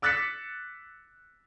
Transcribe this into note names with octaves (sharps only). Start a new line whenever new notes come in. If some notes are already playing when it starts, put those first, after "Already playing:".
D6 E6 F#6 A6 B6 C#7